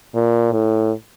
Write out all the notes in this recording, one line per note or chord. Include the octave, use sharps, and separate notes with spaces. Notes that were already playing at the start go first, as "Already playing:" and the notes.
A#2
A2